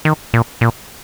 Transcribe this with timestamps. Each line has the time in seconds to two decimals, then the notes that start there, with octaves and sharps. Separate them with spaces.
0.05 D#3
0.34 A#2
0.61 A#2